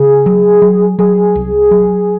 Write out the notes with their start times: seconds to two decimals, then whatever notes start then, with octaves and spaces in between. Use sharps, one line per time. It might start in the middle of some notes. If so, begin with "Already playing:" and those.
Already playing: C#3 G#4
0.26 F#3
0.62 F#3
0.99 F#3 G#4
1.36 C2
1.71 F#3